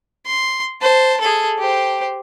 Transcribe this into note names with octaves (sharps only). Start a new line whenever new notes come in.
C6
C5 A5
G#4 A4
G4 C5